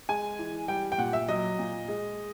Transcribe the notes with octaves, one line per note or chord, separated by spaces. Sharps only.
G#3 G#5
E3
G3 G5
G5
A#2 F#5
E5
F#3 D#5
A#2
G#3